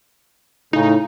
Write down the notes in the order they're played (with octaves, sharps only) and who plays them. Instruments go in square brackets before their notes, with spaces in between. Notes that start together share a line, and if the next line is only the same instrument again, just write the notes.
[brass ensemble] A2 C#3 [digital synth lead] D#4